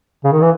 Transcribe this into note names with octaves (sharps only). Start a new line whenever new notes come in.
C#3
D#3
E3